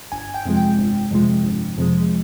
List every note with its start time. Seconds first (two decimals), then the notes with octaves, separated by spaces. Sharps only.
0.12 G1 G#5
0.34 G5
0.45 F2 C3 F3 G#3
0.57 G5
0.78 G1
1.11 F2 C3 F3 G#3
1.44 G1
1.78 F2 C3 F3 G#3